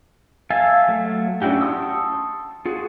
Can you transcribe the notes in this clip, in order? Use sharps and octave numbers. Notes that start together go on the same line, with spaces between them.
E5 F5 G#5 A5
F#3 A3
C#4 D4 E4 F#4 G4
A5 C6 C#6 D#6 E6
F4 F#4 G#4